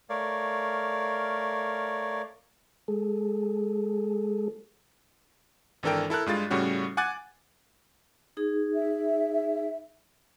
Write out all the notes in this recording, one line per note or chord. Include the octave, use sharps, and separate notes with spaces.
A3 A#4 C#5 D5 F5
G#3 G#4 A4
G#1 E3 D4 A4 A#4 G5
E4 A4 A#4 F#6
G2 G#3 F4 A6
A2 C#3 G3 C#4 F#4
F#5 G#5 D6 F#6 A6
D#4 G#4
E5